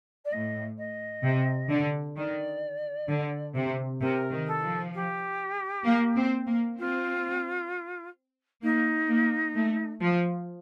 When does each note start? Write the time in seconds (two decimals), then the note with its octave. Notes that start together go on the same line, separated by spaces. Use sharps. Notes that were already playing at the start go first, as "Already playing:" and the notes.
0.25 D5
0.32 A2 D#5
0.78 D#5
1.24 C3
1.70 D3
2.17 D#3 D5
3.09 D3
3.55 C3
4.01 C3 A#4
4.32 D#3
4.47 A4
4.63 F3
4.94 G4
5.85 A#3
6.17 C4
6.47 A#3
6.78 C4 F4
8.63 A#3 D#4
9.08 A#3
9.55 A3
10.01 F3